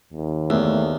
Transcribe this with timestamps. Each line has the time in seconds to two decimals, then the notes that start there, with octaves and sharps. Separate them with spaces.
0.13 D#2
0.50 E2 A3